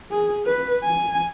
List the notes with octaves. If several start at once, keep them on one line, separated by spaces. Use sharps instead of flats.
G#4
B4
G#5